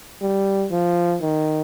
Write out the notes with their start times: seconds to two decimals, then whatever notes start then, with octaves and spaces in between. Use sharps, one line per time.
0.22 G3
0.71 F3
1.22 D#3